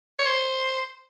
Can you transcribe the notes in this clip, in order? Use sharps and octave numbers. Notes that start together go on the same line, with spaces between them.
C#5
C5